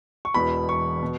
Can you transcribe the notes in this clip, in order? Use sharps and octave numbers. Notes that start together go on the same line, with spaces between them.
C#6
E1 E2 B2 B5
C#6
B2